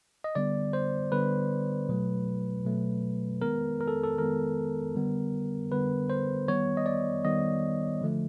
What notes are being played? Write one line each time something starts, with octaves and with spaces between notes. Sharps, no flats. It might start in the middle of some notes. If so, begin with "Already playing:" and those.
D#5
D3 G3 B3 D5
C5
D3 G3 B3 B4
B2 F#3 A3
B2 F#3 A3
D#3 G#3 B3 A#4
A#4
A4
A4
D#3 G#3 B3 A#4
D3 G3 B3
D3 G3 B3 B4
C5
D#3 G3 B3 C#5
D#5
D5
D#3 G3 B3 D#5
D3 F3 A3